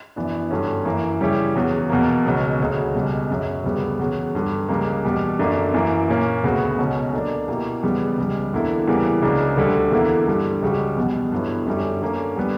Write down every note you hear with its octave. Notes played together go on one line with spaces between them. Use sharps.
F#2 E3 B3 D4
G2 D3 F#3 C#4
F#2 E3 A#3
C#3 G3 C#4 E4 G4
E2 C#3 F#3
E2 B2 A#3
C#2 B2 F#3
D2 C#3 F#3
C#2 B2 G3
F#2 C#3 F#3
D2 C#3 G3 B3
E2 C#3 F#3
G2 D3 G3
C#2 C#3 G3 A#3
E2 B2 G3
F#2 D3 A#3 D4
F#2 E3 A#3
A#2 A#3 C#4
D2 C#3 F#3 B3 F#4
C#2 B2 F#3 C#4
D3 A#3 D4
B2 A#3 E4 G4
E2 C#3 G3 B3
C#2 C#3 G3
E2 D3 A#3 E4
E2 C#3 E3 G3 A#3
C#2 C#3 F#3 A#3 D4
D2 D3 G3
E2 D3 A#3 E4
G2 D3 G3
C#2 C#3 G3 C#4 F#4
E2 B2 G3 B3
G2 D3 F#3 B3 E4
F#2 D3 G3 C#4
D3 A#3 C#4
D3 G3 B3